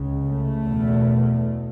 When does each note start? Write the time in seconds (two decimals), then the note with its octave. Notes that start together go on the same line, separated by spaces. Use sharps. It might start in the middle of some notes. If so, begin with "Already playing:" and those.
Already playing: C#2 C#3
0.24 A3
0.66 E2 B2